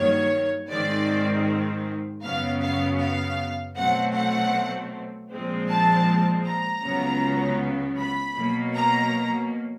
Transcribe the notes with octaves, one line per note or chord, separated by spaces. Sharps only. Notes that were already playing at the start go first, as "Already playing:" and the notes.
Already playing: G2 D#3 F#3 A#3 C#5
G#2 D#3 G#3 C4 D5
F#2 C#3 F#3 B3 F5
F5
F5
B2 F#3 A3 C4 F#5
F#5
A#2 F3 G#3 C4
A5
A#5
C#2 C#3 F#3 B3
B5
B2 F#3 A#3
A#5